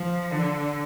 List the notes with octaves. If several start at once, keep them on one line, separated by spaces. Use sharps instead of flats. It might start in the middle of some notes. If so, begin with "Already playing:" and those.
Already playing: F3
D3